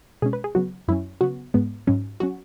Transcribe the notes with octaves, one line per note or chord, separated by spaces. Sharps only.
B2 G#3 C#4 G#4
B4
G#4
C#3 F#3 B3 F#4
F#2 F#3 C#4 E4
C#3 F#3 B3 F#4
G#2 G#3 B3
G#2 F#3 C#4
F#3 C#4 F#4